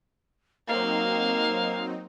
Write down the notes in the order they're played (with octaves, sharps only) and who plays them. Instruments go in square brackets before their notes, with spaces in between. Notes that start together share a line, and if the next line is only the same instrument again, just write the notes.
[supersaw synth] F#3 C4 D#4 [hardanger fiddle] A#3 [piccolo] F5